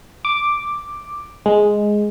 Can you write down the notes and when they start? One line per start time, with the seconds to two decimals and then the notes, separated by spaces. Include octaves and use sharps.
0.25 D6
1.46 G#3